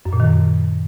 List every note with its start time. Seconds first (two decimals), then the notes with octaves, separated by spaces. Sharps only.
0.05 F#2
0.13 A#2
0.20 D#3
0.27 F#2